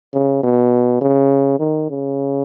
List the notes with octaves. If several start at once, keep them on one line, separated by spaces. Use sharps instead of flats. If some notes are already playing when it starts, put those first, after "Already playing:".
C#3
B2
C#3
D#3
C#3